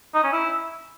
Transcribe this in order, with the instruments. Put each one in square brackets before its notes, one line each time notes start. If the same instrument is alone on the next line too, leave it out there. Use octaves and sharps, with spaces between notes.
[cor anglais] D#4
C#4
E4